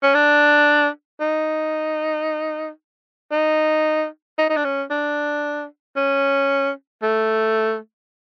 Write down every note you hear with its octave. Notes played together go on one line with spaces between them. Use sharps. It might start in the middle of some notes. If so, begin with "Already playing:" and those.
C#4
D4
D#4
D#4
D#4
D#4
D4
C#4
D4
C#4
A3